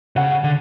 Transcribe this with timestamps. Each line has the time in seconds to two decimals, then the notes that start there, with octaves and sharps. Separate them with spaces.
0.16 C#3 F#5
0.44 D3